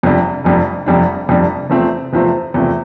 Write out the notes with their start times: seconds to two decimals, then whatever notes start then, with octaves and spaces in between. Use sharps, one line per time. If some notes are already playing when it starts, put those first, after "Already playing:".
0.03 F1 F2 C3 G3 D4
0.44 F1 F2 C3 G3 D4
0.86 F1 F2 C3 G3 D4
1.28 F1 F2 C3 G3 D4
1.70 E2 C3 F3 A3 C4
2.13 E2 C3 F3 A3 C4
2.54 E2 C3 F3 A3 C4